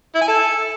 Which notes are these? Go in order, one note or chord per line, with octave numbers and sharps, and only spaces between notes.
E4
G#5
A4